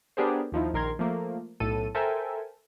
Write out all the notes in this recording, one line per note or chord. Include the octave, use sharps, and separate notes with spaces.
B3 D4 G4 G#4 A#4 C5
D#2 F3 D#4 E4
A#1 D#3 A#4 C6 G#6
F3 A3 A#3
B1 A2 A4 D#7
A4 A#4 C5 E5 G5 G#5